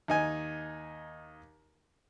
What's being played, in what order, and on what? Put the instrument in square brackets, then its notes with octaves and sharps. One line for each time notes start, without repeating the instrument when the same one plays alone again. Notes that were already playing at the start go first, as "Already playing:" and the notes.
[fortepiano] D#2 D#4 G#5